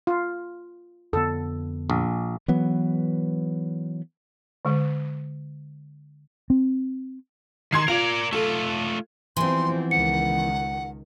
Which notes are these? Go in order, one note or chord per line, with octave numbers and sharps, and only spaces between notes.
F4
F2 D3 B3 A4
A#1
E3 F#3 B3
D3 G#3
C4
D#3 C6 G#6 C7
F4 A#4 D5 F7
A3 F4 A4
E3 F3 G3 B3 C4 C6
C#2 D#3 F#5 C#7